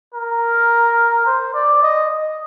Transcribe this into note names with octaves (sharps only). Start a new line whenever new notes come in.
A#4
C5
D5
D#5
D#5